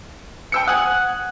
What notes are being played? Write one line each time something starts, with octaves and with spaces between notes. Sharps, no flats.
G5 E6 C#7
F#5 G#5 D#6 F#6